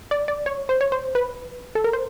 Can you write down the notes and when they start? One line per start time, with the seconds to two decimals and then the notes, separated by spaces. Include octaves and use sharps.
0.11 D5
0.28 D5
0.46 C#5
0.69 C5
0.81 C#5
0.92 C5
1.15 B4
1.75 A4
1.84 A#4
1.93 C5